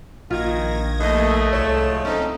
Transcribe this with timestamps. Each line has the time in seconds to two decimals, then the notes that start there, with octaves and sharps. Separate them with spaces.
0.31 A#1 D#3 F4 G#6 A#6
1.00 D#2 A3 D#5
1.53 C2 A2 F3 G#3 C#5 E7
2.05 C4 C#4 D#4 A4